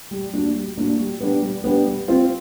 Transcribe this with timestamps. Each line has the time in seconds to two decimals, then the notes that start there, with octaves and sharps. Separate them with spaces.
0.11 G3
0.33 A#3 D4 F#4
0.55 G3
0.77 A#3 D4 F#4
0.99 G3
1.20 B3 D4 G4
1.42 G3
1.64 B3 D4 G4
1.86 G3
2.08 C4 F4